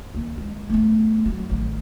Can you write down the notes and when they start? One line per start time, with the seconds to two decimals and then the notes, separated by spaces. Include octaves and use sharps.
0.14 D#2
0.38 G#3
0.70 A3 B3
1.26 F#3
1.49 A1 D#3